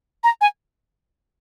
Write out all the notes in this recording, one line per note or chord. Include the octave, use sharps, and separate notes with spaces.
A#5
G#5